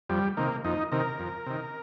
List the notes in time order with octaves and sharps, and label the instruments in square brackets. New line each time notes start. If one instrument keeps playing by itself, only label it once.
[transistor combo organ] F2 G3
C3 D#3 A#3
F2 D#4
C3 D#3 A#4
F2
C3 D#3